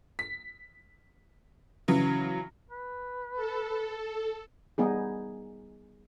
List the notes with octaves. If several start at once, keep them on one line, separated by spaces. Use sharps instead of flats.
B6
C#3 E3 F#3
B4
A4
G3 B3 D#4 G#4